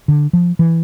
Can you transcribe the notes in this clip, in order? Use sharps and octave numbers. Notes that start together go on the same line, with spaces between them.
D3
F3
E3